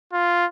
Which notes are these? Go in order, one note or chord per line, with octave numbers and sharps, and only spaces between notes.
F4